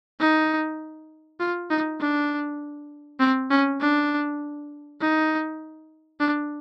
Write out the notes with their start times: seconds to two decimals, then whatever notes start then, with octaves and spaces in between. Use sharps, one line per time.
0.20 D#4
1.40 F4
1.70 D#4
2.00 D4
3.20 C4
3.51 C#4
3.80 D4
5.01 D#4
6.20 D4